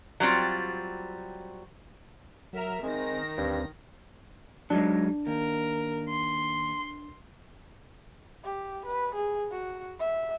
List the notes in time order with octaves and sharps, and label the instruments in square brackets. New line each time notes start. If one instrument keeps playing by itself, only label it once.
[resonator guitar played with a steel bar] F#3 G3 C4 F4
[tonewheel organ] F#3 [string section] A#4 E5 A#5
[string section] D#3 A#6 [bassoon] G#3 [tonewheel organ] C4
[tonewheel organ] D2 C4 [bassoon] G2
[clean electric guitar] F#3 G#3 D#4 [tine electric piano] D4
[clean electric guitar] D#2 [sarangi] A#4
[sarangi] C6
G4
B4
G#4
F#4
E5